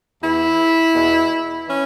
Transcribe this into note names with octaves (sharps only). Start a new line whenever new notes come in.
E2 E3 E4
E2 B2
E3 C#4